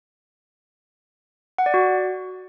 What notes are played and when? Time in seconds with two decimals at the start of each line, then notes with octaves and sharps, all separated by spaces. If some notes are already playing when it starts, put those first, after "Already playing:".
1.58 F#5
1.66 D5
1.74 F#4